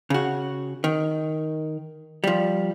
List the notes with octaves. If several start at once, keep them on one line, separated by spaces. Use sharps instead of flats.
C#3 F#4
D#3
F3 G3